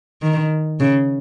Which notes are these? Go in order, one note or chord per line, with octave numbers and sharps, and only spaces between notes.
D#3
C#3